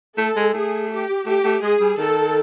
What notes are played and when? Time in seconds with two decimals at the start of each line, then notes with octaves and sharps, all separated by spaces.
0.17 A3 A4
0.36 G#3
0.54 A3 G#4
0.91 G4
1.26 A3 G4
1.44 A3
1.62 G#3 G#4
1.80 G3
1.98 D#3 A4